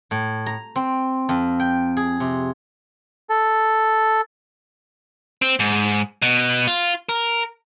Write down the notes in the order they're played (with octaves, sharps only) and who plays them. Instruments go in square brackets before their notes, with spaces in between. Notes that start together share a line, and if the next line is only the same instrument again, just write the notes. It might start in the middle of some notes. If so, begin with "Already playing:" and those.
[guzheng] A2
A#5
C4
F2
G5
G#4
C3
[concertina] A4
[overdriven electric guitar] C4
G#2
B2
F4
A#4